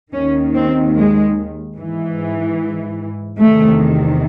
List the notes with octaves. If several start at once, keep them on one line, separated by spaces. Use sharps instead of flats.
D#2 D#3 C#4
C4
G#3
G#2 E3
E2 C3 D#3 A3